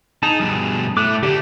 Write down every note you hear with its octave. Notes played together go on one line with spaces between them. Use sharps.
D#4 G#4 A5
G2 B2
A2 A3 D6 F#6
D3 A3 G4